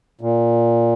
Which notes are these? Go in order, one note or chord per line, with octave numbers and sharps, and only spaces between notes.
A#2